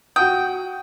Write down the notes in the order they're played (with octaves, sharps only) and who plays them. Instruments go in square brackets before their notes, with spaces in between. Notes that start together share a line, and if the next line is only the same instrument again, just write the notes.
[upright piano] F#4 F#5 D#6 [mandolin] G5